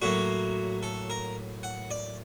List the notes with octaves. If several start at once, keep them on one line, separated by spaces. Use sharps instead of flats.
A2 F#3 A#3 F#4
A4
A#4
F#5
D5